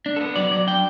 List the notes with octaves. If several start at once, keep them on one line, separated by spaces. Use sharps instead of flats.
D4
A4
B3
F#3 D5
F#3 D5
D4 G5